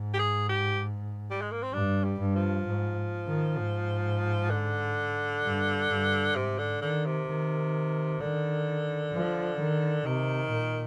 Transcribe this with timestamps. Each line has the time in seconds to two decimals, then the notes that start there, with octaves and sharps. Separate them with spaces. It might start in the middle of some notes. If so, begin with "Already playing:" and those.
Already playing: G#2
0.14 G4
0.19 G#4
0.49 G4
1.30 G3
1.42 G#3
1.52 A#3
1.63 C4
1.73 G2 D4
2.04 G3
2.19 G2
2.35 F3
2.66 G#2
3.27 D#3
3.58 G#2
4.50 D3
5.43 G2
5.89 G2
6.36 G#2 C3
6.59 D3
6.82 D3 D#3
7.05 C3
7.28 D#3
8.20 D3 D#3
9.13 F3
9.59 D#3
10.06 C3 D#3
10.52 A#2